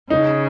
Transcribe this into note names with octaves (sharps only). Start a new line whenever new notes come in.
C#3 D#4